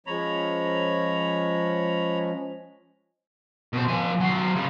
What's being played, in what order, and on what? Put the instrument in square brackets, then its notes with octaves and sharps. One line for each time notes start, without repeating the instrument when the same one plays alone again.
[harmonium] F3 G#3 C#4 [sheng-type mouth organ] C#5 A#5 B5
[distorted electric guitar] B2 C5
F3 G#5
F#3 C5
C#3 G3